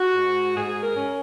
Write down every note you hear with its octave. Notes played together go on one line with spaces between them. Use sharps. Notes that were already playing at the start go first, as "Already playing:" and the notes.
Already playing: F#4
G#2
G#2 G#4
A#4
C#4